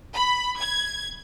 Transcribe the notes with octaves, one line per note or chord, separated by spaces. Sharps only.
B5
G#6